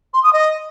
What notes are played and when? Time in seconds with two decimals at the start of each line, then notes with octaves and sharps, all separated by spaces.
0.13 C6
0.23 D#6
0.33 D#5